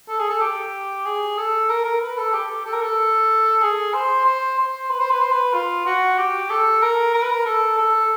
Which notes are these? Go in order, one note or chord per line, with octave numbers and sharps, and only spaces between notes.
A4
G#4
A4
G4
G#4
A4
A#4
A#4
B4
A4
G4
A4
A#4
A4
G#4
C5
C5
C5
B4
C5
B4
C5
B4
F4
F#4
G4
A4
A#4
A#4
B4
A#4
A4
A4